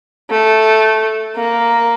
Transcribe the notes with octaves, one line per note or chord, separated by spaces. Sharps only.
A3
A#3